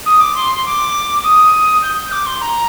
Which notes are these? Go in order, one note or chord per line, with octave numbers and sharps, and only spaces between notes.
D#6
D6
C6
C6
D6
D#6
G6
D6
C6
A#5